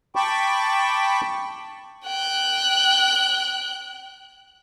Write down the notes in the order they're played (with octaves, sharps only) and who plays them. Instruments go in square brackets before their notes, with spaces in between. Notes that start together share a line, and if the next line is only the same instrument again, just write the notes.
[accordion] G5 A5 B5 C#6 D6
[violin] G5 F#6